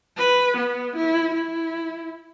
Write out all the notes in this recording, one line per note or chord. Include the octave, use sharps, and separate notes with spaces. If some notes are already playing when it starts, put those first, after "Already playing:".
B4
B3
E4
E4